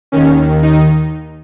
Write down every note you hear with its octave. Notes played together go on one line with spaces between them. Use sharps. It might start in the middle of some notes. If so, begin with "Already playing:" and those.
D#2 D#3 C#4
D#4